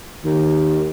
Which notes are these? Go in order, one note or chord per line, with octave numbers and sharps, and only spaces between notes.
D#2 D#3